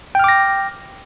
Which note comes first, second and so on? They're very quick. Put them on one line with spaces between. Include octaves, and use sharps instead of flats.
G5 F6 D6 A#6